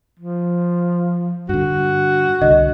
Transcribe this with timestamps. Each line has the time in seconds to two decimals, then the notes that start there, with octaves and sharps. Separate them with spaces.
0.19 F3
1.49 G2 D3 F#4
2.42 C2 D3 D#5